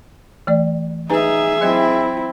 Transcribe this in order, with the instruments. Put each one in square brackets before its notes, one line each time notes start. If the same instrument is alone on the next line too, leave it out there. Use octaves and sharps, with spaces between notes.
[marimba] E3 A3 D5
[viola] D#4 [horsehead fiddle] G#4 E5 [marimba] B4 G#5 A#5
[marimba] F#3 D#5 G#6 [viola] C4 E4